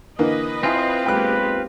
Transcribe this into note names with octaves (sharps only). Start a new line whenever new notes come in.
D3 E3 A#3 B4 D#5
C4 E4 F4 G#5 C6
B1 G#3 A#3 G4 B4 G5 F#6